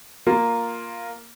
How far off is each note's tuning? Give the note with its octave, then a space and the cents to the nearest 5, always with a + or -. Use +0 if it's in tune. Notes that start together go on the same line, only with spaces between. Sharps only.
A#3 -5 F4 +0